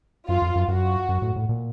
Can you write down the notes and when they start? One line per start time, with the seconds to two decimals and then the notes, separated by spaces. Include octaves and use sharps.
0.28 F#2 F4
0.42 F2
0.55 F#2
0.68 F#2 F#4
1.09 F#2
1.22 A2
1.36 A2
1.49 A#2